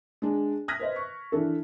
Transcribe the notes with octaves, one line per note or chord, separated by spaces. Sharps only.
G#3 D4
D#6 F6 F#6 G#6 A#6 B6
B4 C5 D#5
C#6
E3 D4 A4